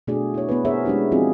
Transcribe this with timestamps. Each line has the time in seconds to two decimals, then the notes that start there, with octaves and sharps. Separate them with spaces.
0.07 B2 A3 D4 F#4 G#4 D5
0.34 E4 C#5
0.49 B3 E4 B4
0.65 G#4 A#4 C5 C#5 E5
0.85 G#3 C#4 D4 E4 G4
1.12 F3 C4 D#4 F4 F#4 G#4